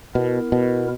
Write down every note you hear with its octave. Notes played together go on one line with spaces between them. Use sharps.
B2 B3 E4 A#4
B2